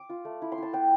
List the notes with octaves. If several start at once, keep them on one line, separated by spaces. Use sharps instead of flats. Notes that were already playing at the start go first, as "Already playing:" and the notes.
Already playing: D6
F4
A3
E4
C6
E4 A5
B3 G5